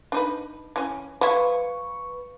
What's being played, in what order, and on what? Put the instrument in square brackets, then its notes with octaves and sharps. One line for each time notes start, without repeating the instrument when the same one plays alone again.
[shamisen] D4 D#4 B4
E3 C#4
[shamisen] F3 E4 [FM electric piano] B4 C#6